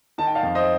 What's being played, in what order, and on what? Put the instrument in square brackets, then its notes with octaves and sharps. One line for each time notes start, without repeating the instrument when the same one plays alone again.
[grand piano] D#3 A5
G5
F5 A5
F2
C5 D#5